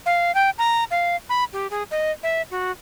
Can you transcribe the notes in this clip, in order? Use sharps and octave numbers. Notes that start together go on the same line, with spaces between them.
F5
G5
A#5
F5
B5
G4
G#4
D#5
E5
F#4